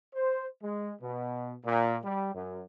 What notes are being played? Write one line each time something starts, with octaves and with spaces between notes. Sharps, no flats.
C5
G#3
B2
A#2
G3
F#2